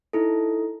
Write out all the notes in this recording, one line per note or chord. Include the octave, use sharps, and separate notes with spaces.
D#4 E4 A4